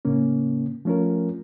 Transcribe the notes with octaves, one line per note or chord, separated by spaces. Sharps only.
A2 C#3 A#3 C#4
F3 A3 C#4 F4 A#4